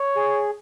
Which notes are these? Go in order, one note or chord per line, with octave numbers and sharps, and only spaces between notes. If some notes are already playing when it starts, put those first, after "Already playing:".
Already playing: C#5
G#4